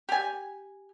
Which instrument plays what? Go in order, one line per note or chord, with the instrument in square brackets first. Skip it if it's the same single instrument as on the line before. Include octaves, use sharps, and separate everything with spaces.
[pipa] G4 G#5